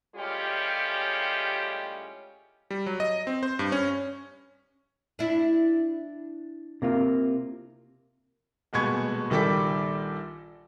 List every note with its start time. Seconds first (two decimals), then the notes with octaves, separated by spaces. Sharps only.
0.16 A2 G3 G#3 C#4 F4 G4
2.71 G3
2.86 F#3
3.00 D#5
3.27 C4
3.43 C5
3.59 G2
3.72 C#4
5.19 D4 E4
6.82 C3 A#3 F4
8.73 D#1 B2 G#3 B3 C#6 G#6
9.30 A#1 D#3 G3 A4 D6 B6